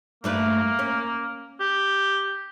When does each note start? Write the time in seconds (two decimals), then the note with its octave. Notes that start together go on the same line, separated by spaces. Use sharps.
0.24 G2 A3 A#3 B4
0.79 C#4
1.60 G4